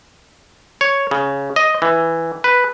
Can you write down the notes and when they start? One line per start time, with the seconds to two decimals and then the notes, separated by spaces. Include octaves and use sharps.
0.81 C#5
1.11 C#3
1.56 D#5
1.82 E3
2.44 B4